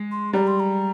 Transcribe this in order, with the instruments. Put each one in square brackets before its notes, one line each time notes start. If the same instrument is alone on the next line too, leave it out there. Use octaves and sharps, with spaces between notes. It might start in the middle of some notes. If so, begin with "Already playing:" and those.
Already playing: [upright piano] G#3
[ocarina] C6
[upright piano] G3 [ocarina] A#5
[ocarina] C6
A#5